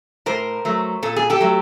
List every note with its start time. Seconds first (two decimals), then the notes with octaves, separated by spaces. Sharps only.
0.26 A2 A#4 C5
0.65 F#3 A3
1.02 A#2 A4
1.16 G#4
1.30 G4 A4
1.41 F#3 A3